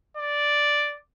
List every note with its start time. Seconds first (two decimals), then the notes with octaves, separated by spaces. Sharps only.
0.17 D5